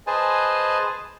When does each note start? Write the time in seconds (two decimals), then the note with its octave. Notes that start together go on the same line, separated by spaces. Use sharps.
0.07 G#4 B4 C5 D#5 G#5 A5